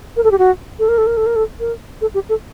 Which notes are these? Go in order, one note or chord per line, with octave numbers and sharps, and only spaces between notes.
A#4
A4
G4
F#4
A4
A#4
A4
A#4
A4
A#4
A4
A#4
A4
G4
A4